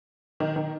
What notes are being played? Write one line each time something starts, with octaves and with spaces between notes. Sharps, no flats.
D#3
D#3